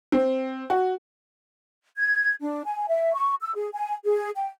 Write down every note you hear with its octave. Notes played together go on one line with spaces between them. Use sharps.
C4
F#4
G#6
D4
G#5
E5
C#6
E6
G#4
G#5
G#4
G5